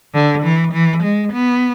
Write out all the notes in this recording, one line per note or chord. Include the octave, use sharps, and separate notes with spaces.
D3
E3
E3
G#3
B3